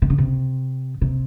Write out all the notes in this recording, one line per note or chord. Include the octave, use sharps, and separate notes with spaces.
C3
C#3
C3
C3